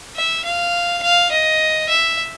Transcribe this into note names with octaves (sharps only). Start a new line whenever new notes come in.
E5
F5
F5
D#5
E5